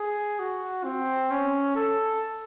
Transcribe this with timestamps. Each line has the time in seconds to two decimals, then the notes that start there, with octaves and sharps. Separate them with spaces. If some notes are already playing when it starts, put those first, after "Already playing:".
Already playing: G#4
0.39 F#4
0.85 C4
1.31 C#4
1.76 A4